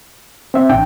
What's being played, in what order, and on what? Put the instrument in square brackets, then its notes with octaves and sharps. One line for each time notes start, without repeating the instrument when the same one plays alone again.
[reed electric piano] C4 E5
[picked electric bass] A1 D4 [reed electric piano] G5